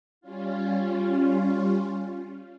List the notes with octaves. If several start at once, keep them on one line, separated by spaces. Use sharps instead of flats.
G3 C#4 F4